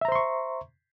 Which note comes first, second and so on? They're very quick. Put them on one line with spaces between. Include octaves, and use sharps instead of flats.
E5 A#5 C5 C6 C#6